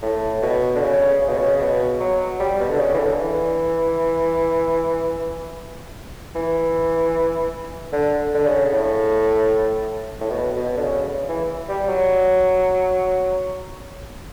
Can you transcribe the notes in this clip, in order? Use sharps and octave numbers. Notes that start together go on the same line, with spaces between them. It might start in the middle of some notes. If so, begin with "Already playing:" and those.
A2
B2
D3
C#3
C#3
B2
C#3
B2
F#3
G3
B2
D3
C#3
E3
D3
E3
E3
D3
D3
C#3
A2
A2
B2
B2
D3
C#3
E3
G3
F#3